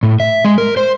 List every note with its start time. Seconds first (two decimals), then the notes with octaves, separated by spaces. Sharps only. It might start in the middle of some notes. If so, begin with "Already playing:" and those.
0.03 A2
0.20 E5
0.45 G#3
0.58 A#4
0.77 C5